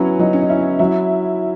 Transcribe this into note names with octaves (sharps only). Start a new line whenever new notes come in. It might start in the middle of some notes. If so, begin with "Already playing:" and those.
Already playing: F#3 B3 C#4 E4
F#3 D#4
C#4
D#4
C#4 E4
F#3 E4